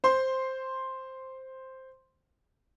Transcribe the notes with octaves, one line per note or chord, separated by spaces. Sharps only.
C5 C6